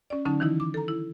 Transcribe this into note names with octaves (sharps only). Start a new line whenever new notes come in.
C#4 D5
D3 F#3 C#4 D#4 A5
D#3 E3 D#4 E4
D6
A4 A#5
E4